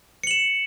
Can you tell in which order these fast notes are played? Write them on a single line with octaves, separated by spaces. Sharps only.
C#7 F#7 E7